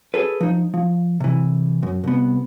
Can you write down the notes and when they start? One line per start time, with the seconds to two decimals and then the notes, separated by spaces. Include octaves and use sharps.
0.14 G#4 A4 B4
0.41 F3 D#4
0.74 F3
1.20 C3 E3
1.83 F#2
2.04 C2 B3